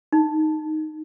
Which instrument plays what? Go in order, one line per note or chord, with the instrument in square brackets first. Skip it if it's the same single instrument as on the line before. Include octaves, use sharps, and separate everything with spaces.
[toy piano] D#4